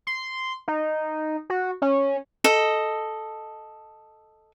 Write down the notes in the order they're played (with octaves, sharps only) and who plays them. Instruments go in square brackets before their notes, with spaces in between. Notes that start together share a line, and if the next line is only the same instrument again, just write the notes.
[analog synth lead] C6
D#4
F#4
C#4
[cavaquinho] A4 D#5